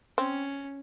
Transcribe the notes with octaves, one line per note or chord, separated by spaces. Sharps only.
C4 C#4